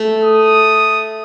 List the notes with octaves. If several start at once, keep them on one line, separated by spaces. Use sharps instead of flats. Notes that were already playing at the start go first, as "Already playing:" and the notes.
Already playing: A3
D#6